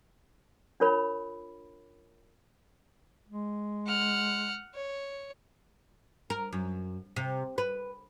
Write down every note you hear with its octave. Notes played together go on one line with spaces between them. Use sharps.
D4 F4 A#4 C#5 B5
G#3
F#5 F6
C#5
A#4
F#2
C3
B4